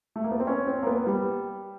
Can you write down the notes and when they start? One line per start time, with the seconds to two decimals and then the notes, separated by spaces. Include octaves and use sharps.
0.16 A3
0.24 A#3
0.32 B3
0.40 C4
0.47 C#4
0.67 C4
0.83 A#3
0.87 B3
1.07 G3